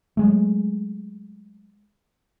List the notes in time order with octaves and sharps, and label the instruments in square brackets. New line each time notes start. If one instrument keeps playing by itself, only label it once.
[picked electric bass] F#3 G#3 A3